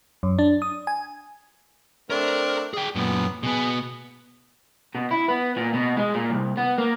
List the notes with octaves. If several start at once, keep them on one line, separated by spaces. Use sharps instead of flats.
F#2
D4
D#6
G#5
A3 C4 D4 A#4
G#4 G5
F#2 A#2 B3
B2 B3 G#4
B2
E4
B3
A#2
B2
G#3
A#2
C2
B3
A#3